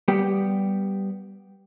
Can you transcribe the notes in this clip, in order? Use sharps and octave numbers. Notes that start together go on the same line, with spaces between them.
G3 B3 G4